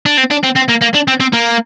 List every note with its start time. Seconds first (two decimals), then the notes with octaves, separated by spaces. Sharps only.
0.06 D4
0.18 C4
0.31 D4
0.44 C4
0.56 C4
0.69 A#3
0.82 A#3
0.94 D4
1.08 C4
1.20 C4
1.33 A#3